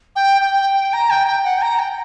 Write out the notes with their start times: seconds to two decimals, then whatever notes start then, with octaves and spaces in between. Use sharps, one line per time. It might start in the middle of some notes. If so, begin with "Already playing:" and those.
0.16 G5
0.42 G5
0.93 A#5
1.10 G5
1.27 G5
1.45 F#5
1.57 G5
1.62 A#5
1.79 G5